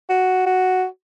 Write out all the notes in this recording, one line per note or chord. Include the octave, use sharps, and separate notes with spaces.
F#4
F#4